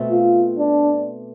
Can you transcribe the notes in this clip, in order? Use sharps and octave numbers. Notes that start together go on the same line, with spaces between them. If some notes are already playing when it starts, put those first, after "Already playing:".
Already playing: B2 A3 C4
F4
D4